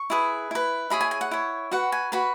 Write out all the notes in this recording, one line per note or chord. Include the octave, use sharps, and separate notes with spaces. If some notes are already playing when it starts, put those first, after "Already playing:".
Already playing: C#6
E4 G#4 B4
E4 B4
E4 G#4 C#5 B5
G#5
G#5
F#5
E4 C#5
F#4 B4 F#5
G#5
F#4 B4 B5